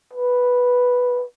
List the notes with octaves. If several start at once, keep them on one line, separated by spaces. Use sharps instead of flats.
B4